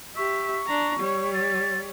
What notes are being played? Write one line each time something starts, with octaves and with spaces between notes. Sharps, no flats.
G4 E5 C#6
D4 A#5
G3 C#5
A6